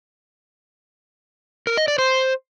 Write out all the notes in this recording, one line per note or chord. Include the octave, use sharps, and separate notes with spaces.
A#4
D#5
D5
C5